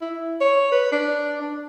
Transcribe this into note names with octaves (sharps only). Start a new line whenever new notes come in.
E4
C#5
B4
D4
D4